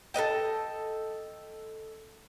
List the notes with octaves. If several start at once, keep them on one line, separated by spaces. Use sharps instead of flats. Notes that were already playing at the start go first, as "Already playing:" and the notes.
A4 B4 D#5 G5